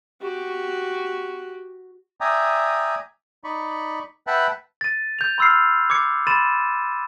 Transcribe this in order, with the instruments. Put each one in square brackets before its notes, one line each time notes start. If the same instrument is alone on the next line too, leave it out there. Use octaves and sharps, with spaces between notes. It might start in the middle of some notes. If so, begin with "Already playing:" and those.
[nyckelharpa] F#4 G4
[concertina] D5 E5 G5 G#5 A#5 D#6
D#4 D5 B5 C#6
B4 E5 F#5 G5 A5 B5
[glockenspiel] A6 D#7
G6 F7
B5 C6 E6 F6 C7
D6 G#6 C#7
B5 C6 A6 D#7 E7